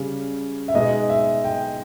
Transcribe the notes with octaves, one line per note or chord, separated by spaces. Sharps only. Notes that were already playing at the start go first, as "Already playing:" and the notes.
Already playing: C#3 G3 C#4
E5
B2 G#3 D#4 D#5
E5
G5